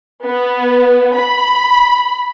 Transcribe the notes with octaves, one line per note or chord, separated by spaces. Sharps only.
B3
B5